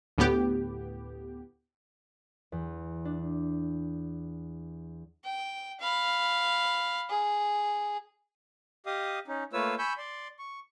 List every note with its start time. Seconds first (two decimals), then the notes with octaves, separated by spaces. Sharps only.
0.18 D2 A2 B3 G4
2.52 E2
3.05 D4
5.24 G5
5.80 F5 B5
7.10 G#4
8.86 G4 D#5 F5 D#6
9.28 C#4 D#4
9.53 A3 A#3 F4 B4 C#5 E6
9.78 G#5 B5 C#6 E6 G6
9.98 D5 C6
10.39 C#6